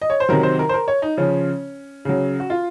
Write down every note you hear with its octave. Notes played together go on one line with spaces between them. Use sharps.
D#5
C#5
C5
C3 D#3 F#3 A#4
C5
A#4
C5
A#4
C#5
D#4
C#3 F3 C#4
C#3 F#3
F#4
F4